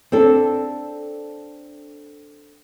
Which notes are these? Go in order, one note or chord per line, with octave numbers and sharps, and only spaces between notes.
C4 D4 A4